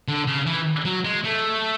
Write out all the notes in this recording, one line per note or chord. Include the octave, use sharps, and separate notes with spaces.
D3
C#3
E3
F#3
G#3
A3